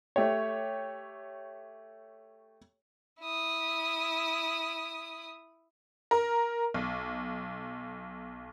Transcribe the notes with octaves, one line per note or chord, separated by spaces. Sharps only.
A3 G4 C#5
E4 D#6
A#4
B1